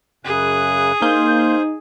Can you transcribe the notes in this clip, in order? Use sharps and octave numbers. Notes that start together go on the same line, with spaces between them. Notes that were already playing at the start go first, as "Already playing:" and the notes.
F#2 C#3 G#4 F#6
A#3 D#4 C5 F5 G6